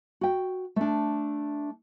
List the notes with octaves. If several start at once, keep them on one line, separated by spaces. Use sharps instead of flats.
F#4 G5
A3 D4